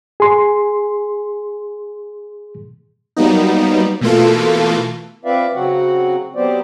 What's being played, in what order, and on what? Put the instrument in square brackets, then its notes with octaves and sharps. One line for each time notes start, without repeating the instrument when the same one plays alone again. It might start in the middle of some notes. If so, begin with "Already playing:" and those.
[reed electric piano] G#4 C6
[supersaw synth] F#3 G3 A#3 B3 D#4
B2 E3 A3 A#3 F4 A4
[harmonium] C4 F4 B4 D5 E5 F5
C#3 F#3 C4 F#4 F#5
F#3 B3 C4 G4 C5 D5